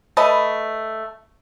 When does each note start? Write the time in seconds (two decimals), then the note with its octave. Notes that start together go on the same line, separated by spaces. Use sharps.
0.17 A3 B4 D#5